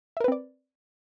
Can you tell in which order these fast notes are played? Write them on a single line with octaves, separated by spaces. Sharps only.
E5 A#4 B4 C4 D5